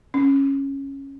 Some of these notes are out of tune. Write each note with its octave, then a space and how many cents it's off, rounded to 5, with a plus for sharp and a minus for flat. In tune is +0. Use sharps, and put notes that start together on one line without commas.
C#4 -10